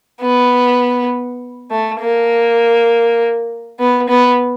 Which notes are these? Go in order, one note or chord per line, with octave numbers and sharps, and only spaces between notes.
B3
A3
A#3
B3
B3